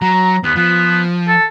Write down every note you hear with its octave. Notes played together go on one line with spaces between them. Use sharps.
F#3 A#5
D#2 B3
F3 B3
A4